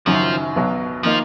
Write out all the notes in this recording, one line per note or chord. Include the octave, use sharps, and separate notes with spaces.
F#1 F#2 D#3 F3 F#3
B1 B2 F#3
D#3 F3 A#3 D#4